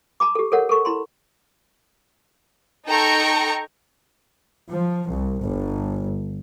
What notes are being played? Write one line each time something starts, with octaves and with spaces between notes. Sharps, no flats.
A5 B5 D6
G4 A4
A4 A#4 C#5 F#5
A4 A#4 C#6
E4 B5 C6
D#4 A4 G5 A#5 C#6
F3
C2
G1